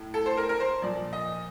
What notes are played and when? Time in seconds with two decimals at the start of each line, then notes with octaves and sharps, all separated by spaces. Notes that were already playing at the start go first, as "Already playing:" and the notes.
Already playing: A2
0.14 A4
0.26 C5
0.37 A#4
0.49 A#4
0.60 C5
0.82 A#2 F3 D5
1.13 D#5